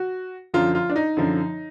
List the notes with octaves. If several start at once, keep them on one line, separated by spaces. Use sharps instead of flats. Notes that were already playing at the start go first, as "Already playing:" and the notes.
Already playing: F#4
F#2 D3 F3 F4
F4
D4
D#4
F#2 D3 F3